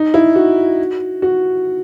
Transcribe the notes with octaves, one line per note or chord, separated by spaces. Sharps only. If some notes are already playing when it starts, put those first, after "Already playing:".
Already playing: D#4
E4
F#4
F#4